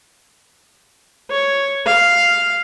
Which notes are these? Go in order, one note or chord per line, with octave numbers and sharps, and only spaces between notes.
C#5
F5